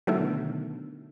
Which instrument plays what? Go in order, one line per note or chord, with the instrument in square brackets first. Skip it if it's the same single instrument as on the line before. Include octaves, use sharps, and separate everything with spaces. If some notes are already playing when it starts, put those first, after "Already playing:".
[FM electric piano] B2 D3 D#3 [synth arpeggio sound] F#3 A3 E4